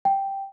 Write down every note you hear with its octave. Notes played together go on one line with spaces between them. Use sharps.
G5